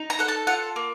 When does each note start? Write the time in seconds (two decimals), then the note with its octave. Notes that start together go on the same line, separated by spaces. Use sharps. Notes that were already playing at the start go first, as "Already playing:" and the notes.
Already playing: D#4
0.10 A#5
0.19 A4 F#5
0.28 A5
0.47 F4 F#5
0.76 A#3